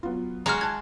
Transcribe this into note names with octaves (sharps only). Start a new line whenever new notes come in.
F#3 B3 F4
G#3 F#4 A#5 F6
A5 F#6 G#6